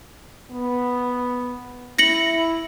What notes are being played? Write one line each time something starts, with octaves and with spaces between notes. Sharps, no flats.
B3
E4 A#6 C#7 F#7